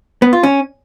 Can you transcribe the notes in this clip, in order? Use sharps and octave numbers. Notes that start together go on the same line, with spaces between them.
B3
F4
C#4